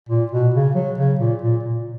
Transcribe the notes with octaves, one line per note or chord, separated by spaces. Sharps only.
A#2
B2
C#3
F#3
C#3
A#2
A#2
A#2